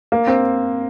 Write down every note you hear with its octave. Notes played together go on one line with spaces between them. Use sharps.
A#3
C4